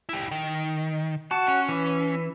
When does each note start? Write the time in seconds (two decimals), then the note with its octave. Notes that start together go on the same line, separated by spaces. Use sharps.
0.09 E4 G4
0.31 D#3
1.31 F#4 A5
1.47 C#4
1.69 E3